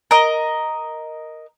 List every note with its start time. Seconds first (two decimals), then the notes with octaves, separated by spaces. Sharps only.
0.11 A#4 D#5